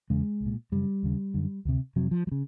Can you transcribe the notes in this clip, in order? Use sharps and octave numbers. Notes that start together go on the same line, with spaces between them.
E2 C#3 G#3
C2
A#2
F#2 C#3 G3
D#2 C#3
F#2 D3
D2 C3
F2 C3 F#3
F3
F#3
C#3